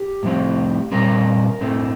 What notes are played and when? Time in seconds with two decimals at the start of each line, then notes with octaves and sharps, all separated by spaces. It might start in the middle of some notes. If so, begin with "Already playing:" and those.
Already playing: G4
0.23 A2 F3 C4
0.92 A#2 G3 C4 A#4
1.61 A2 A3 C4